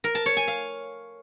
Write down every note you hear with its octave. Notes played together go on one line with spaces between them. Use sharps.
A#4
A5
C#5
G#5
F5